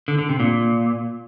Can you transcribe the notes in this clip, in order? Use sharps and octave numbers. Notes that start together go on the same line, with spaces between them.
D3
D3
C3
A#2